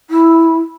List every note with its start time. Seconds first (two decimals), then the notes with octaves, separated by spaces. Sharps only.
0.10 E4